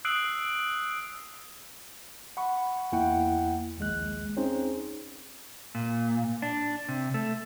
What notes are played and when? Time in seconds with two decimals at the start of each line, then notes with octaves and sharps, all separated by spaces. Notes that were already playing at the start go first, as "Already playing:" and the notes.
0.05 D#6 E6 F#6 C7 D7 F#7
2.37 F#5 B5 C#6
2.92 E2 A#3 E4 F#5 G5
3.78 A#1 D#2 G#3 F#6
4.37 C4 C#4 D#4 G#4 C5
5.75 A#2
6.42 D4
6.89 C3
7.14 A3